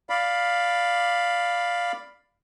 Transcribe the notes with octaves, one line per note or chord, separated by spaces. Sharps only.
D5 F5 B5